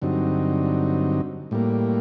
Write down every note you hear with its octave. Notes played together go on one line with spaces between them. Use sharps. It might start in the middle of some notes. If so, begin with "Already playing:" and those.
G2 D3 F#3 C4 D#4
A2 G3 A#3